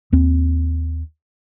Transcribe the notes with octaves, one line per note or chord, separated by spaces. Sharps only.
D#2 C4